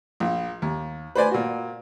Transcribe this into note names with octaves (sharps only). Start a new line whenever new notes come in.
A#1
D#2
B4 C5 D5 G#5
A#2 F#4